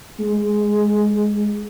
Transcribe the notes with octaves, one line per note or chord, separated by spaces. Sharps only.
G#3